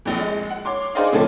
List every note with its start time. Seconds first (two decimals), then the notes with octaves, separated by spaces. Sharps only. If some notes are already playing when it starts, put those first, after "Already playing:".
0.05 A#1 F2
0.19 G#3
0.50 F#5
0.65 C#5 C6 D6
0.95 D#4 G#4 C5 D5 D#5 F5
1.13 A2 C#3 F3 C4 C#4 A4